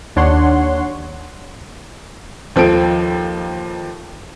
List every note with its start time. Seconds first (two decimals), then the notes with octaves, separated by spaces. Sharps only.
0.16 D#2 D4 C#5 F#5 C6
2.56 D#2 F3 A4 D7